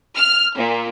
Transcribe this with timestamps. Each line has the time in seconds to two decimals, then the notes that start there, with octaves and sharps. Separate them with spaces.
0.16 F6
0.57 A#2